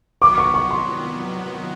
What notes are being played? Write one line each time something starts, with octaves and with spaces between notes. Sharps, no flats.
D#3 F#3 B3 D6
C#6
C#6
C6